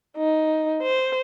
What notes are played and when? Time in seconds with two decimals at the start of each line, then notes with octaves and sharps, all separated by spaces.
0.17 D#4
0.83 C5